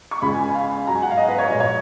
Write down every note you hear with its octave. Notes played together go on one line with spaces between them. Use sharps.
C#6
C#2 C#3 G#3 B5
G#5
G#5
F5
G#2 F#3 A#5
G#5
F#5
F5
D#5
B4
C#5
A#2 F3 G#3 D#5
C#5